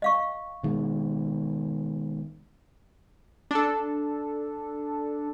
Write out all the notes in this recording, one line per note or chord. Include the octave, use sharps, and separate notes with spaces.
D#5 F5 C#6
B2 D#3 G#3
D4 A4